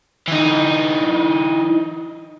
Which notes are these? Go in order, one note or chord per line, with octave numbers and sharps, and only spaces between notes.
E3 D#4